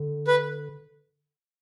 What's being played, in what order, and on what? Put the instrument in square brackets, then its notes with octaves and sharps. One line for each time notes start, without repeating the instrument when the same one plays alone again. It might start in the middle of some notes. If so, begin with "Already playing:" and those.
Already playing: [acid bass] D3
[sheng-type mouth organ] B4